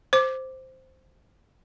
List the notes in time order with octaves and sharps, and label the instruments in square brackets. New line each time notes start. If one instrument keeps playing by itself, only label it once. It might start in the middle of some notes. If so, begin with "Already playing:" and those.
[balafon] C5 D6